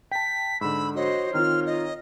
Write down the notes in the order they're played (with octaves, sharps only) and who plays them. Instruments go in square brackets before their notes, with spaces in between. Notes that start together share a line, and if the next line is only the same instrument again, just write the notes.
[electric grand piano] G5 A5 [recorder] B6
[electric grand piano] G#2 D3 [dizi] B5 [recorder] E6
[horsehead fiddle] F#4 C5 [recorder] C#5 [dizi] D#5
[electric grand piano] D#3 C4 D#4 [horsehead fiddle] F4 [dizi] F6
[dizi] D#5